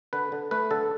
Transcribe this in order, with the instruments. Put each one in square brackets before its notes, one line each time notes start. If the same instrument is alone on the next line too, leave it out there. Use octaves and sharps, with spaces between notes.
[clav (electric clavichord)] D3 B4
D3
A3 B4
D3 A4